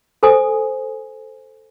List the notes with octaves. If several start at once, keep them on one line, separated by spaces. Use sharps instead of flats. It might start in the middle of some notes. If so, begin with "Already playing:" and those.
A4 C5 G#5 D#6